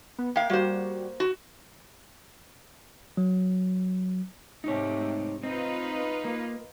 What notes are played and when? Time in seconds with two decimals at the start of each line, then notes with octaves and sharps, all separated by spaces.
0.18 B3
0.36 A#3 F5 G5
0.50 G3 A#3 F#4 C5
1.20 F#4
3.17 F#3
4.64 G#2 C3 A3 D#4 C#5
5.43 C4 D#4 F4 B4
6.25 A#3